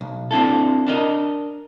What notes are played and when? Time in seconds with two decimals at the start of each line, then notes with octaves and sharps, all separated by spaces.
0.01 B1
0.31 C4 D4 E4 A4
0.87 D4 A#4 D#5